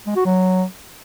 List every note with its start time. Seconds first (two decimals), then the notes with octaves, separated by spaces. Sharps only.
0.07 G#3
0.16 F#4
0.26 F#3